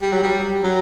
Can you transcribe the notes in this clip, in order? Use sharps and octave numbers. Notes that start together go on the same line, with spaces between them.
G3
F#3
G3
F#3